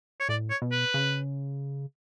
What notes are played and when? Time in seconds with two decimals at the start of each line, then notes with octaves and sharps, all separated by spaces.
0.20 C#5
0.29 A2 D5
0.50 C#5
0.62 B2
0.72 B4
0.94 C#3